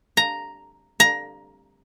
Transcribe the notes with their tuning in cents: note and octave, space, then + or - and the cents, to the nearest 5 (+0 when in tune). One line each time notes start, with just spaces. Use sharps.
A#5 +0
A#5 +15